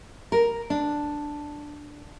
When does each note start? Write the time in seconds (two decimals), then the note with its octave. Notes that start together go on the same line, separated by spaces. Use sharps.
0.32 A#4
0.70 D4